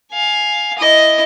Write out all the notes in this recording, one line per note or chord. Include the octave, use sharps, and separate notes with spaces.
F5 G#5
E4 D#5